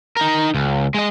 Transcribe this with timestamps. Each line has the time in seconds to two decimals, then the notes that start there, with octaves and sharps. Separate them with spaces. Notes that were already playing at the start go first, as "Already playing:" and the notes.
0.17 D#4 A#4
0.55 C#2
0.95 G#3 D#5